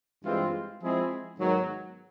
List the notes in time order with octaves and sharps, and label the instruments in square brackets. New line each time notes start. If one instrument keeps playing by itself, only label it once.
[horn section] G2 E3 G#3 C4 F4
F3 G#3 C4 E4 G#4
G#2 D#3 F#3 B3